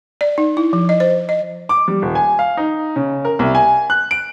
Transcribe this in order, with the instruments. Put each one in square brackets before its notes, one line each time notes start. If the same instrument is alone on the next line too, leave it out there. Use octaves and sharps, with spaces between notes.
[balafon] D5
D#4
E4
F3
D#5
C5
D#5
[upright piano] D6
G3
D#1
G#5
F5
D#4
C#3
A#4
C2
G#5
F#6
D7